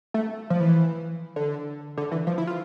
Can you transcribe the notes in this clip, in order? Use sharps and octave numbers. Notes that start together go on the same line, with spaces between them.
A3
F3
E3
D3
D3
E3
F3
E4
F4